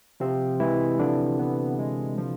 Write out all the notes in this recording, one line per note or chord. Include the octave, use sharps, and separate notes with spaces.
C3 F3 C4
E3 G#3 E4
D3 F3 D4
B3
G#3
F3